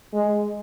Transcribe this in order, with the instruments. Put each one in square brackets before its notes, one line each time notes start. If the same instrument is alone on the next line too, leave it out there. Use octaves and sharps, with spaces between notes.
[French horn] G#3